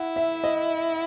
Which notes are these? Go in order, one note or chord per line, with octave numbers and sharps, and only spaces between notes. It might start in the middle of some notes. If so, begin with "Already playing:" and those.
Already playing: E4 F#5
E5
D#5